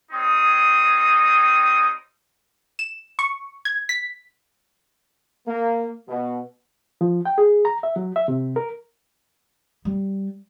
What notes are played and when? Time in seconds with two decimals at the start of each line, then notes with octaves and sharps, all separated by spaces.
0.12 G3 C4 D#4 C#5 D#6
2.79 E7
3.19 C#6
3.65 G#6
3.89 B6
5.46 A#3
6.08 B2
7.01 F3
7.25 G5
7.38 G#4
7.65 A#5
7.83 E5
7.96 F#3
8.16 E5
8.28 C3
8.56 A#4
9.85 G3